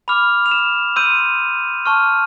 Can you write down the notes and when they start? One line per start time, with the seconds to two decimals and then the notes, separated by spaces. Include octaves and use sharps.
0.08 B5 D6 F6 F7
0.46 F7
0.51 E7
0.96 C6 E6 G6 D#7
1.86 A5 C#6 F6